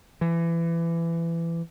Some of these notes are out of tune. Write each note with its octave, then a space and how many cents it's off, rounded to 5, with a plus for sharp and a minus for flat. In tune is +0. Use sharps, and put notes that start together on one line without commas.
E3 +25